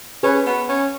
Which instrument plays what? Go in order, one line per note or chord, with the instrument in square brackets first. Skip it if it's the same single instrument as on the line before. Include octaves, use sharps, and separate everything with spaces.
[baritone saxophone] C#4 [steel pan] G#4 B4
[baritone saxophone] B3
C#4